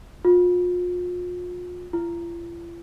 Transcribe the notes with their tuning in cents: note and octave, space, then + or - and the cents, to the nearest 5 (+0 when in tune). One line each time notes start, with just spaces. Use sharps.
F4 +35
F4 -45